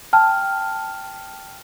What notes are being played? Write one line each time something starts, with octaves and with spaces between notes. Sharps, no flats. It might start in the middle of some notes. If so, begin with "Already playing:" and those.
G5 A5 F6